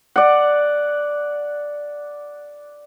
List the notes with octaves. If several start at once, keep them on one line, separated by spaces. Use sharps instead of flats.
D5 F#5